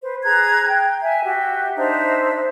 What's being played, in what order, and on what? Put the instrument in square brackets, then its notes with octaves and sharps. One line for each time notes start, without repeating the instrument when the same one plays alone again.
[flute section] B4 C5
G#4 A#5 F#6 G#6
G5
E5 G#5
F#4 G4 E5
D4 D#4 C5 E5